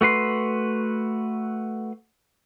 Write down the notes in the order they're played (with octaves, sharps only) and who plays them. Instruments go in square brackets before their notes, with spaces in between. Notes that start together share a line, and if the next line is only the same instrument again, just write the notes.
[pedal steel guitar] A3 F#4 B4 C6